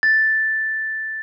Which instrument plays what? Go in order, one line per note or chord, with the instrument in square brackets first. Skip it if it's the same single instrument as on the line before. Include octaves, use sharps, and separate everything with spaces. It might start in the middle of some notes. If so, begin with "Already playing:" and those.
[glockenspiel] A6